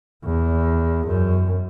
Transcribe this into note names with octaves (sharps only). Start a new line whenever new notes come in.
E2
F#2